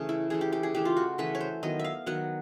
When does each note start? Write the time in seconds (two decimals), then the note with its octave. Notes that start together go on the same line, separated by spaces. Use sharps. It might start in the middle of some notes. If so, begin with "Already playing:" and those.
Already playing: C#3 E3 A3
0.09 E4
0.30 C#3 E3 A3 G#4
0.41 G4
0.53 G4
0.63 G#4
0.75 C#3 E3 A3 G4
0.85 F4
0.97 F#4
1.18 C#3 E3 A3 B4
1.35 C#5
1.41 C5
1.63 D#3 F#3 B3 D#5
1.79 E5 F5
2.06 D#3 F#3 B3 F#5